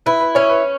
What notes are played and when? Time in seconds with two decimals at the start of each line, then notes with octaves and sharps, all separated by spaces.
0.06 E4 B4
0.20 B4
0.35 C#4 C#5
0.49 B4